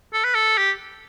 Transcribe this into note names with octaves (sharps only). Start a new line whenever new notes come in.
A4
B4
A4
G4